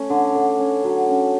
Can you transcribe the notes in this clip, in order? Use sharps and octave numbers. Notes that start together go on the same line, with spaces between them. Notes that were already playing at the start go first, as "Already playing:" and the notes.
Already playing: A3 C#4
D3
D3
C#4
F#3
C#4